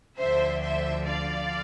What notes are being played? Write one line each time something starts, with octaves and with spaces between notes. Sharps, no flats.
D2 D3 F3 C5 E5
C5 E5
D5 F5